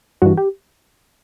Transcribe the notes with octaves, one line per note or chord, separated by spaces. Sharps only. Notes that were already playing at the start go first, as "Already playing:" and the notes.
G2 E3 F#4
G4